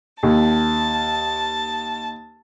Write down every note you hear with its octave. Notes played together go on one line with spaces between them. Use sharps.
D#2 A5